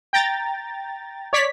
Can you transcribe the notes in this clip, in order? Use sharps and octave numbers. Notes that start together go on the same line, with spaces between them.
G5 A#5 A6
C#5 D5 B6